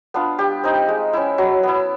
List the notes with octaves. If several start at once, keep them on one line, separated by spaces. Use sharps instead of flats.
B3 D4 F4
G3 G4
C4 D#4
G#3
C#4 E4
F#3
B3 E4